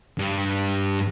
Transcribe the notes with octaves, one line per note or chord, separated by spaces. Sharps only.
G2